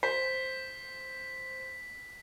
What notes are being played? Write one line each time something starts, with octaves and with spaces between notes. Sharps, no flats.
C5 B6